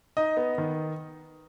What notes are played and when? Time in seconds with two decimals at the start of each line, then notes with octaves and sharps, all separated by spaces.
0.17 D#4 D#5
0.37 B3
0.58 D#3